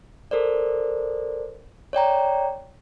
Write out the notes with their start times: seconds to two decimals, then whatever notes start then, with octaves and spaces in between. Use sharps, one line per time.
0.31 A4 A#4 C5 D5
1.93 C#5 D5 G5 A#5